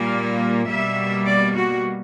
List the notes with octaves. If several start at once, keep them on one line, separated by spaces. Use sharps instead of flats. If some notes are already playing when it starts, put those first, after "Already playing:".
Already playing: A#2 G3 A#3
B2 G3 A#3 E5
D5
F#4